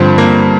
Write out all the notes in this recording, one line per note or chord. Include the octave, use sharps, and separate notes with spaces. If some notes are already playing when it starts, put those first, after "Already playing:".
Already playing: G2 D3 F3 C4
A#3